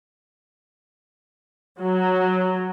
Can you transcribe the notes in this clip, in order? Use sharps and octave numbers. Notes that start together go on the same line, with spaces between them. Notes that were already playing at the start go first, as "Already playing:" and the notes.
F#3